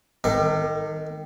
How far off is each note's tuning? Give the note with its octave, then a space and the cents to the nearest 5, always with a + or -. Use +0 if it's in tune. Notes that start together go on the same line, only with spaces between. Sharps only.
D#3 +0 A4 +45 D6 +25